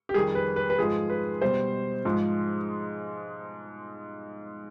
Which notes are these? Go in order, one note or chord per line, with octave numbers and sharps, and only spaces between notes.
G4
F2 D#3 G3 G#4
B4
B4
B4
G#2 F3 G#3 G#4
B4
B2 G3 C5
G#2 F3 G#3